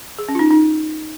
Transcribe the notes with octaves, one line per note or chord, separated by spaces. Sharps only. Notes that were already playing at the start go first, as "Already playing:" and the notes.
G#4
C#4
F4
D#4
D#4